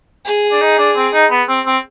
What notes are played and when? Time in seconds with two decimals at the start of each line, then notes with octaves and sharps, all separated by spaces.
0.25 G#4
0.52 D4
0.61 D#4
0.78 D4
0.96 C4
1.13 D#4
1.31 B3
1.49 C4
1.66 C4